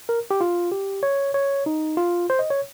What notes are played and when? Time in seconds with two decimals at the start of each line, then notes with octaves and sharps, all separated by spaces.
0.09 A#4
0.31 G4
0.41 F4
0.72 G4
1.03 C#5
1.34 C#5
1.66 D#4
1.97 F4
2.30 C5
2.39 D#5
2.50 C#5